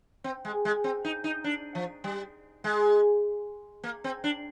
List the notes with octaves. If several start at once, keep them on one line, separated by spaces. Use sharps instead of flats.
C4
G#3
G#3
C4
D#4
D#4
D4
F3
G3
G#3
A#3
C4
D4